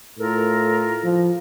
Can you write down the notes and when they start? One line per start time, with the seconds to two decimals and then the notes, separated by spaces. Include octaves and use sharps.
0.19 A2 F4 A4 A#4
1.04 F3